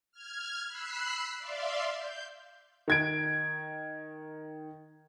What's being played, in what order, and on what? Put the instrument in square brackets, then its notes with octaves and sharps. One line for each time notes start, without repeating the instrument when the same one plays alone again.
[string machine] F6 G#6
B5 E6 F#6 C7
D5 E5 F5 C6
G6
[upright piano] D#3 G#6 D7